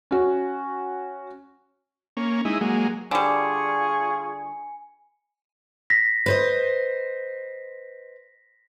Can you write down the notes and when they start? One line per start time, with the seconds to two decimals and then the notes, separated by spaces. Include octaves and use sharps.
0.11 C#4 F#4
2.17 A#3 C#4
2.45 G#3 D#4 E4
2.61 F#3 G#3 A#3
3.11 D3 G3 F4 G#4 G#5 B5 C#6 C#7
5.90 A#6 B6
6.26 B4 C5 D#5